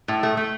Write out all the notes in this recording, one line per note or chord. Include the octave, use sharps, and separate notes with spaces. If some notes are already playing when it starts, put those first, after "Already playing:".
A2
A3
A3